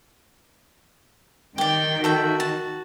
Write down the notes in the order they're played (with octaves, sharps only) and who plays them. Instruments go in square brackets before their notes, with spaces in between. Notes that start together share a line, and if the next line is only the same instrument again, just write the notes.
[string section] D#3 [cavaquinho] G4 D5 [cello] G5
[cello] F#4 [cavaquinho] A4 E5 G5
[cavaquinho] A5